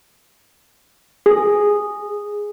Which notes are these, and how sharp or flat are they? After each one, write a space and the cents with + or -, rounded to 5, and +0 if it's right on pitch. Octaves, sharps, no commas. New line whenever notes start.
G#4 -5